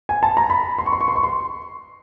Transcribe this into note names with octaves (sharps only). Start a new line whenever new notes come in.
G#5
A5
A#5
B5
C6
C#6
C6
C#6
C6
C#6
C6